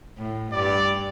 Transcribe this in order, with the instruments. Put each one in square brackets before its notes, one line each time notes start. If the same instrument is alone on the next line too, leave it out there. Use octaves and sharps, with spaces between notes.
[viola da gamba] A2
[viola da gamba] G2 [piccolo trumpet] D5